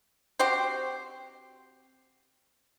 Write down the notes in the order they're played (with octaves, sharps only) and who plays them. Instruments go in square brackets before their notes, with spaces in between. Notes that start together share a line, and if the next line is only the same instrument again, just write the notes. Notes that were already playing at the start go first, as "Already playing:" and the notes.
[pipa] C4 F#4 G4 C5